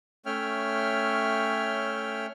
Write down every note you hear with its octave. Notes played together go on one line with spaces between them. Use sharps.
A3 C#4 C#5 E5 G5 F6